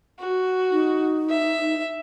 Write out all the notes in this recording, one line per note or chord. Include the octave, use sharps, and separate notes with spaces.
F#4
D#4
E5